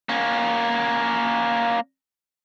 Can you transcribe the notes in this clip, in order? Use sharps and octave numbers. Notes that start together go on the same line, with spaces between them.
A#3 C#4